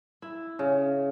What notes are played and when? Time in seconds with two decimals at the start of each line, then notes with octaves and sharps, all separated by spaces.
0.22 E4
0.59 C#3